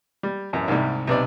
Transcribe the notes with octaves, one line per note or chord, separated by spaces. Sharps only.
G3
A1 F#2
C2 G#2 C3 G3
B1 C3 B3 D5